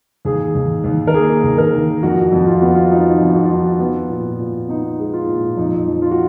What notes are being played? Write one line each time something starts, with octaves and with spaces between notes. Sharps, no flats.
D#2 G#4
D#2
D#2
A#4
A#3 G#4
D#2
A#4
D#3
F2 F#4
F2
F4
B3 F#4
F4
F3 D#4
D#4
F2
F#4
F4
F3 D#4
F4
B3
A#2
A#2
B3 D#4
G#3
F4
A#2
F2 D#4
F3
F4
F#4